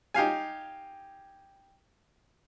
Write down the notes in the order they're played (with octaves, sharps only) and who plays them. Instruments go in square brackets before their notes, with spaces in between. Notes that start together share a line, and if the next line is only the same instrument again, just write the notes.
[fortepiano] D#4 G4 F5 G#5